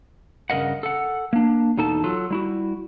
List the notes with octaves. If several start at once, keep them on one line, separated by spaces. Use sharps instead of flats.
G2 C#3 A#4 D#5 F#5
A4 F#5
A#3 D4
E2 B2 D#4 A4 A5
F#3 F4 A4
G3 E4 F#4